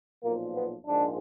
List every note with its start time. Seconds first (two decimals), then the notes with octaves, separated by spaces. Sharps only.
0.24 B1 A#2 F3 A#3
0.56 B3
0.87 A#1 G#2 F3 G#3 D4